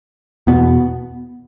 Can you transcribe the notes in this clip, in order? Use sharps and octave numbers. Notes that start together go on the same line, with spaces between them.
E2 B2 B3